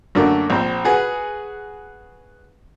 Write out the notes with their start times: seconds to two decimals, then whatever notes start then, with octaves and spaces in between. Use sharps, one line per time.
0.15 F#2 D3 A3 A#3 D4 F#4
0.50 A#1 C4 C5
0.85 F#4 G#4 B4 F#5